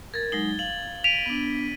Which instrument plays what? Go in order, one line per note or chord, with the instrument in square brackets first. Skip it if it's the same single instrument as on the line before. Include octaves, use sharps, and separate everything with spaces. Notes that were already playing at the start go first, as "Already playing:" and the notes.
[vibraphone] A#4 [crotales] G#6 A6
[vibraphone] F#3 G#3 D#4 [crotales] G7
[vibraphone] F5 [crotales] F#7
[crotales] B6 D7 D#7 [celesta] F7
[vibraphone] B3 D4